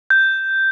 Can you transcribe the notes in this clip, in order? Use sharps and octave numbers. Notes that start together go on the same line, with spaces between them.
G6